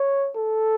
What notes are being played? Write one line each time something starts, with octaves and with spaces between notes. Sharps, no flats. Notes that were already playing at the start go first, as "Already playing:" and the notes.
Already playing: C#5
A4